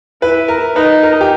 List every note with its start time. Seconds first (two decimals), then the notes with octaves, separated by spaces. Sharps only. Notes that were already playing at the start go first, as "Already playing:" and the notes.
0.22 E4 B4
0.48 A#4
0.75 D#4 B4
1.03 A#4
1.21 G4